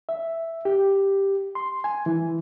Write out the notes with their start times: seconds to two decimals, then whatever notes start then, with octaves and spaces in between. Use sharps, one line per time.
0.09 E5
0.65 G4
1.55 C6
1.84 G#5
2.06 E3